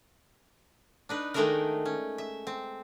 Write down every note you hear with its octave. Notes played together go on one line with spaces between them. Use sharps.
D4 D#4 B4
D#3 G#3 A3 D4 D#4 A#4
C#4
E5
C4